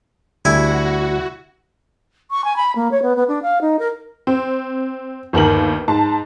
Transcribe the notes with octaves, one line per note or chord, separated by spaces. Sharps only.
D2 G3 E4 F#4 G#5
C#6
G#5
B5
A#3
C#5
B3
B3
D4
F5
D#4
A#4
C4
G1 D#2 A#4 F#7
G#2 A5